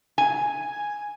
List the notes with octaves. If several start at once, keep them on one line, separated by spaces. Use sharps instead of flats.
G#5